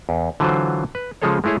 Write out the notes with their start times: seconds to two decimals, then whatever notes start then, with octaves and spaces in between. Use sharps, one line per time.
0.09 E2
0.40 D3 E3 F#3 F4 C5
0.95 B4
1.22 C#3 F3 G#3 G#4 A4 C#5
1.44 G#3 A3 E4 G#4 C#5